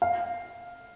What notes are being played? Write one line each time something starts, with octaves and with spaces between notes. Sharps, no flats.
F5